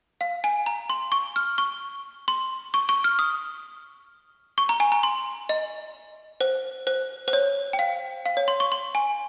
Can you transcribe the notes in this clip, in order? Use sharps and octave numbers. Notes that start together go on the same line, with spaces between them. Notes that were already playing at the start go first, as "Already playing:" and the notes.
F5
G#5
A#5
C6
C#6
F6
C#6
C6
C#6
C#6
F6
D#6
C#6
A#5
G#5
A#5
C6
D#5
C5
C5
C5
C#5
G5
F5
F5
C#5
C6
C#6
C6
G#5